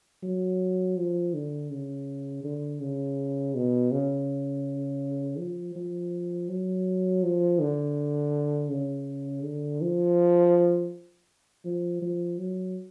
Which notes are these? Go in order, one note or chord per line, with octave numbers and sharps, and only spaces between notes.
F#3
F3
D3
C#3
D3
C#3
B2
C#3
F3
F3
F#3
F3
D3
C#3
D3
F3
F3
F3
F#3